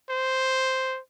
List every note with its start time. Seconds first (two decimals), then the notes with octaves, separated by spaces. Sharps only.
0.10 C5